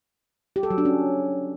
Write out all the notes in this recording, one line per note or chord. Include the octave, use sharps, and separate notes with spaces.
G4
A4
F#3
D4
C#4